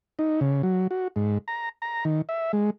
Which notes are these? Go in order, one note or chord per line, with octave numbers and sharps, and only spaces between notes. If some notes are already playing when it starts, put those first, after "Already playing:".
D#4
C#3
F#3
F#4
G#2
A#5
A#5
D#3
E5
G#3